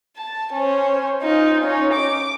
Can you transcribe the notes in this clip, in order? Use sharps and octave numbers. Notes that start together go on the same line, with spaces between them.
A5
C#4 C5
D#4 F4
C#4 D#4
D6